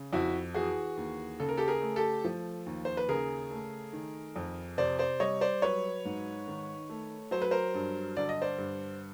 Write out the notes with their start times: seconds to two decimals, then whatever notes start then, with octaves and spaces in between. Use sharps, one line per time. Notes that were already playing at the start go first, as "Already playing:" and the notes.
Already playing: C#3
0.13 F2 E4 F#4
0.54 E3 F#4 G#4
0.97 D#2
1.40 C#3 A4
1.49 A#4
1.57 G4 A4
1.68 G#4 A#4
1.82 A3
1.96 G4 A4
2.24 F3
2.66 D#2
2.85 C5
2.97 B4
3.08 C#3 G#4 A#4
3.51 A3
3.93 D#3
4.36 F2
4.78 C3 C5 D5
4.99 C5 D5
5.20 G3 C#5 D#5
5.41 C5 D5
5.62 F#3 B4 C#5
6.05 G#2
6.48 D#3
6.90 A3
7.31 F#3 C5
7.42 B4
7.51 A#4 C5
7.74 G2
8.17 D3 D5
8.29 D#5
8.42 C5 D5
8.58 G2